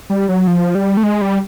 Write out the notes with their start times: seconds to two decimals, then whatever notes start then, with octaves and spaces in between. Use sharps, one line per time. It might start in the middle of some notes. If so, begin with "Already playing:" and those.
0.10 G3
0.29 F#3
0.47 F3
0.75 G3
0.97 A3
1.03 G#3
1.21 G3